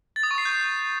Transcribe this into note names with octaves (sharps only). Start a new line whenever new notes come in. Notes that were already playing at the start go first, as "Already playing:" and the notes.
A6
D#6
C#6
C7
G6